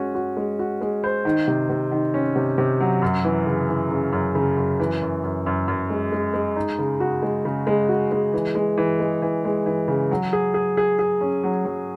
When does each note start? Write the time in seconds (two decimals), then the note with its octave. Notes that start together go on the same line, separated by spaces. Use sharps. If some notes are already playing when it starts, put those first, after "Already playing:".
Already playing: G#3 C#4 F#4
0.15 F#4
0.37 G#3
0.59 F#4
0.81 G#3
1.04 C5
1.25 D#3
1.48 C3
1.70 C3
1.91 D#3
2.14 C#4
2.36 C3
2.58 C3
2.80 F#3
3.02 F#2
3.24 E3
3.46 C#3
3.69 E3
3.91 C#3
4.12 F#2
4.35 C#3
4.57 F#2
4.80 E3
5.02 F#2
5.23 F#2
5.46 F#2
5.68 F#2
5.90 G#3
6.12 G#3
6.34 G#3
6.56 D#4
6.79 C#3
7.00 F#4
7.22 G#3
7.45 C#3
7.67 G#3
7.89 F#4
8.11 G#3
8.33 E3
8.55 G#3
8.78 E3
9.00 G#3
9.22 E3
9.45 G#3
9.66 E3
9.88 C#3
10.11 F#3
10.33 G#4
10.54 G#4
10.77 G#4
10.99 G#4
11.21 C#4
11.43 F#3
11.65 F#3